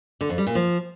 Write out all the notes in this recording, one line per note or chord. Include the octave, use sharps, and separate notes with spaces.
D3
F2
G3
A#2
F3